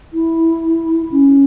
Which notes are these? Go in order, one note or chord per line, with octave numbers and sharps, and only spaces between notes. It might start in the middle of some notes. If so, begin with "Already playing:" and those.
E4
C#4